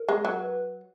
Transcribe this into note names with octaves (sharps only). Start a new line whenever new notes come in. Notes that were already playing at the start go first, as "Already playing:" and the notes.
Already playing: A#4
G#3
F#3
B4